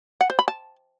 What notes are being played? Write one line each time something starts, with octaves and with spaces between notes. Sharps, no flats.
F#5
C5
B5
A5